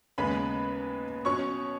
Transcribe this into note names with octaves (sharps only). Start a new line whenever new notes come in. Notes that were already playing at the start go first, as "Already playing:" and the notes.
D#2 C#3 G#3 B3 B4 B5
B2 F#3 C#4 C#5 C#6